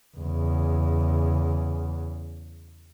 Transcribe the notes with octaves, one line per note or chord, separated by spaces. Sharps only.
E2 C#3